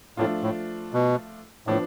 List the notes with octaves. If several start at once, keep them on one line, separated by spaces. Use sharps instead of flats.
A2 F3 A3 D4 F4
A2
B2
A2 F3 B3 D4